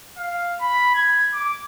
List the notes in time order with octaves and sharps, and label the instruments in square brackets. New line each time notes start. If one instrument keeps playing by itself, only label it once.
[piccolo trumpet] F5
B5
G#6
D6